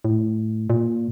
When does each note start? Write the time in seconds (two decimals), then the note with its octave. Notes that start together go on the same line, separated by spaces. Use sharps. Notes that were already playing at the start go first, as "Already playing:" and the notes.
0.05 A2
0.70 A#2